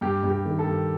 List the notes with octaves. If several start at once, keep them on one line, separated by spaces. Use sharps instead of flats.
G2 G4
G2
G4
D#3
A4
G2